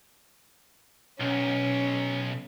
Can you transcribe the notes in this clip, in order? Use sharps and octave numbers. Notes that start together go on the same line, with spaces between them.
B1 C#4